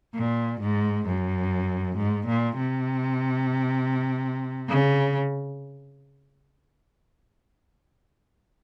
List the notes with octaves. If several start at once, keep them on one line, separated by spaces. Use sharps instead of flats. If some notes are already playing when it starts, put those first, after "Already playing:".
A#2
G#2
F#2
G#2
A#2
C3
C#3